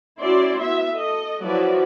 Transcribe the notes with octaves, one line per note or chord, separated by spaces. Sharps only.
C#4 E4 F#4 D5 C6
B3 E5
A4 D#5
F3 F#3 E4 F#4 B4 D5